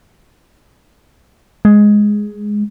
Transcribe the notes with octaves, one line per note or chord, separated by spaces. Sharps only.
G#3